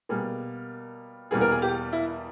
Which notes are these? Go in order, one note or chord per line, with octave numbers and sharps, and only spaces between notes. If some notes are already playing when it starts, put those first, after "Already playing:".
B2 G3 A#3 G#4
E2 B2 G3 A#3 G#4
A#4
G#4
G4
E4